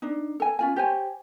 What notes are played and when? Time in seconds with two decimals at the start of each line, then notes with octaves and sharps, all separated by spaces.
0.02 D4 D#4
0.40 A4 G#5
0.59 C#4 F4 G#5
0.76 G4 C5 C#5 G#5